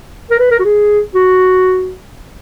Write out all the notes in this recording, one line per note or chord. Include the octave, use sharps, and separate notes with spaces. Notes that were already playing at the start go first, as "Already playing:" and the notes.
A#4
B4
A#4
F#4
G#4
F#4